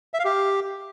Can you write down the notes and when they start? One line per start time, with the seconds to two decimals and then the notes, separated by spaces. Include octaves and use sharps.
0.14 E5
0.19 F5
0.25 G4